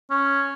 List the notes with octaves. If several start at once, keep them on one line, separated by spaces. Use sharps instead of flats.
C#4